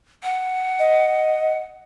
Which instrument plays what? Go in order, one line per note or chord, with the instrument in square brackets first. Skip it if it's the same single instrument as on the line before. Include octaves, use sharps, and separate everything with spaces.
[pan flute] F#5
[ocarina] D#5